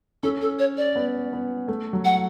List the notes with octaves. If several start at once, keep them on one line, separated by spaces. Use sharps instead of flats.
C#4 A4
A4
C#5
D5
B3
B3
A3
F#3
F#5